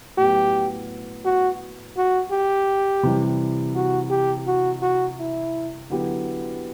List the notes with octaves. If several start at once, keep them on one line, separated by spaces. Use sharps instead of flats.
A2 F#3 B3 G4
F#4
F#4
G4
C3 E3 G3
F#4
G4
F#4
F#4
E4
D3 F#3 B3 E4 G4